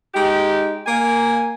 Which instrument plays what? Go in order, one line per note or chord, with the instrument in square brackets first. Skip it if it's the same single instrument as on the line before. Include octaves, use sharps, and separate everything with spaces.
[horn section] G#3 D#4 G4
A#3 G#5